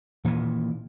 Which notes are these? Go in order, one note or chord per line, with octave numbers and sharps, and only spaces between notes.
A#2 D#3 E3